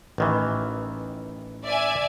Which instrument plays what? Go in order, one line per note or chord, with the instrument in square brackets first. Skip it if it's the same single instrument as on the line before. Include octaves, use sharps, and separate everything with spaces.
[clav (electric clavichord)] A1 D#3 E3
[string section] D5 E5 G#5